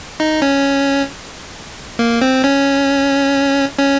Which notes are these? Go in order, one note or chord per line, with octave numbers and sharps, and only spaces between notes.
D#4
C#4
A#3
C4
C#4
C#4